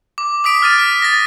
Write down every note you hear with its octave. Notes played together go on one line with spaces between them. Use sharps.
D6
D6 D#6 B6 D7
F6 A6 D#7
F6 B6
A6 A#6